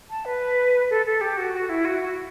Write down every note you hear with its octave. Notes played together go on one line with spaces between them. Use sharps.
A5
B4
A4
A4
G4
F#4
F#4
E4
F#4
F#4